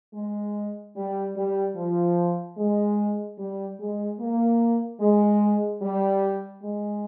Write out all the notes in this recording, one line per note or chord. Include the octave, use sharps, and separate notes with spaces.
G#3
G3
G3
F3
G#3
G3
G#3
A#3
G#3
G3
G#3